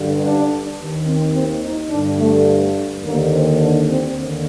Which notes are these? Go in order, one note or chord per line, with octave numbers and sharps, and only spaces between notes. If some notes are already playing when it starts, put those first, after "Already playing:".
Already playing: G2 D3
D4
D#2 D#3
C4
C4
D#4
G2 D3 D4
A3
D#2 D3 A#3
C4
D4
C4
D#2 D3